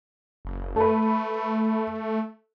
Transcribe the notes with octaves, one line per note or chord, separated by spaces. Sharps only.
F#1
A3 A4 B4